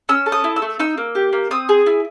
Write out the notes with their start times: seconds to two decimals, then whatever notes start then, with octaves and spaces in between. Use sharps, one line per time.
0.09 C#4 E6
0.26 A4
0.32 D#6
0.44 E4
0.56 E6
0.62 A3
0.80 D#4 E6
0.98 A#3
1.15 G4
1.33 A#3
1.51 C4 D#6
1.69 G#4
1.86 E4